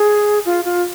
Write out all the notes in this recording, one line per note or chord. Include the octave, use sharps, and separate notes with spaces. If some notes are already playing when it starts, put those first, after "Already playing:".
Already playing: G#4
F4
F4